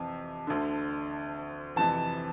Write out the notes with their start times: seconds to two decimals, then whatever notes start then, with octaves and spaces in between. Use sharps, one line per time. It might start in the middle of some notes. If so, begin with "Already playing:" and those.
Already playing: F2 C3 E3
0.47 D2 D3
1.76 F2 C3 E3 A5